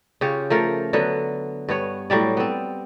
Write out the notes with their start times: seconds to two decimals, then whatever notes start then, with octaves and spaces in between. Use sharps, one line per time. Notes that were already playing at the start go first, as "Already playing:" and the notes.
0.21 C#3 F4 G4 C#5
0.50 F3 A3 A#4
0.93 D3 F#3 B3
1.69 G2 B3 C#5
2.10 A2 F#3 G3 D5
2.37 B3 C4